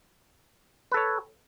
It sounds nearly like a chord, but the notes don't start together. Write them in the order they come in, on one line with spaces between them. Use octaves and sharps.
B4 A4 C#5